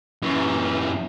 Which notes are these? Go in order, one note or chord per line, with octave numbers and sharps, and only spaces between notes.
F#2 E3